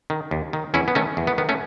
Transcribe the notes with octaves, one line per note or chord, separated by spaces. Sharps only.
D#3
D#2
D#3
E2 C#4 E4
B3
D#3 A3 C#4
E2
B3
D#3 B3
A3 C#4